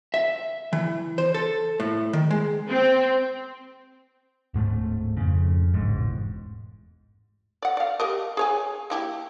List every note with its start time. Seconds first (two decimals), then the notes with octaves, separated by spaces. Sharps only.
0.14 E5
0.73 E3
1.18 C5
1.34 A4
1.80 A2
2.13 D#3
2.30 G#3
2.68 C4
4.54 D1 G#2 G#3 A3
5.17 F2 C#3
5.74 E1 A1 G#2
7.62 D5 F#5
7.77 D5 F5
8.00 G4 A#4 D#5
8.37 G#4 C#5 G#5
8.90 A#3 E4 G4